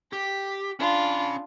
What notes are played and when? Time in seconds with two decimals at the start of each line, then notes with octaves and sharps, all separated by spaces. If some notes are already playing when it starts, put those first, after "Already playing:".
0.13 G4 B6
0.79 C#4 D4 F4 B5